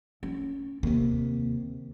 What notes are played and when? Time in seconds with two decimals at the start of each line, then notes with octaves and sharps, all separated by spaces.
0.23 C#4
0.83 D#2 C3 A#3